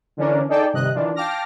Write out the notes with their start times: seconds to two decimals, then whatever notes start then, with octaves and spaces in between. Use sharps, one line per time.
0.17 D3 E3 C#4 D4 A#4
0.49 D#4 G#4 A4 D5 G5 A5
0.73 G2 C3 D#3 D#5 F#6
0.95 D#3 E3 D4 F4
1.16 F5 G5 A5 D6 F6 A#6